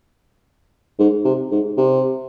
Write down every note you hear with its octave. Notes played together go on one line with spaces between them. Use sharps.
G#2
C3
G#2
C3